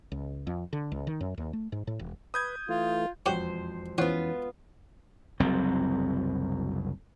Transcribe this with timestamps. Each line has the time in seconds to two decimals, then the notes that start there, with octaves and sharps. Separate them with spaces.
0.12 C#2
0.47 F2
0.73 D3
0.92 C#2
1.07 D#3
1.21 F#2
1.38 D#2
1.53 A3
1.72 G#2
1.87 A2
1.99 E1
2.34 B4 D#6 G6 G#6
2.69 E3 A3 F4
3.26 E1 F2 C#4 F#4 G4 C5
3.98 E3 B3 C#4 F4 C5 C#5 F#5
5.40 F#1 C2 F#3 C4